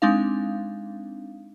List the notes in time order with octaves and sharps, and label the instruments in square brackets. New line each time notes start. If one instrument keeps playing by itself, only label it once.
[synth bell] G#3 C4 D4 D#4 F5